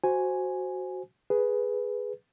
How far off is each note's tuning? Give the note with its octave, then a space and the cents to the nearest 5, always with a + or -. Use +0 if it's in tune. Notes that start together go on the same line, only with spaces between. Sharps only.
F#4 +0 C5 +0 G#5 +0
G#4 +0 B4 +0